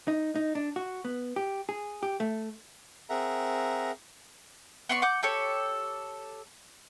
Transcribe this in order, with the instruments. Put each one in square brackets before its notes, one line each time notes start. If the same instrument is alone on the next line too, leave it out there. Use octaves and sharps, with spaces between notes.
[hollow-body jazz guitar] D#4
D#4
D4
F#4
B3
G4
G#4
G4
A3
[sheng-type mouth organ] C4 G#4 A#4 E5 F#5 A#5
[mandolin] B3 D5 C6 C#6
F#5 D6 G6
G4 A4 C#5